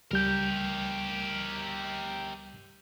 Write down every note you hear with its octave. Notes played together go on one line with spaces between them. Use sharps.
C#2 G3 G4 A#4 G6